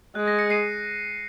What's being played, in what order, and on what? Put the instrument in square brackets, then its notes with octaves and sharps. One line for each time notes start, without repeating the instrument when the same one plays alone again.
[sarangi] G#3 [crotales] F#6
[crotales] A#6
A#6 C#7
C7 D#7